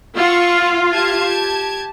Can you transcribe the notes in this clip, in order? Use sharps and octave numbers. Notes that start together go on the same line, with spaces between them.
F4 F#5 C#6 E6
G4 A5 G#6